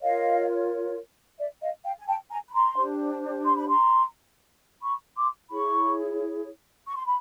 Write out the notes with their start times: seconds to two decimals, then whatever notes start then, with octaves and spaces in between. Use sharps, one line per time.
0.02 F4 A#4 C#5 D#5 F5
1.39 D5 E5
1.62 D#5 F5
1.85 F5 G5
1.98 G#5
2.07 G5 A5
2.30 G#5 A#5
2.48 B5
2.53 A#5 C6
2.76 D4 G4 C5
3.45 C6
3.56 B5
3.68 A#5 C6
4.82 B5 C#6
5.16 C6 D6
5.50 E4 G#4 C#5 B5 C#6
6.88 C#6
6.97 C6
7.06 B5